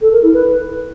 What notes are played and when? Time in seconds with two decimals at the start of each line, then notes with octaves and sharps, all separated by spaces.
0.01 A4
0.12 A#4
0.23 E4
0.33 B4